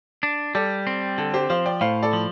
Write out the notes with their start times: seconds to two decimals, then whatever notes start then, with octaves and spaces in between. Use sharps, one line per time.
0.23 D4
0.55 G3 A4 D5
0.87 C4
1.18 D3 A4
1.34 G4 C5
1.50 F3 C5 F5
1.66 D5 G5
1.81 A2 C5 F5
2.03 A4 D5
2.13 F3